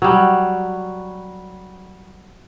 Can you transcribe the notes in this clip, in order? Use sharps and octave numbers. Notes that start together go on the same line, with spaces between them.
F#3 G3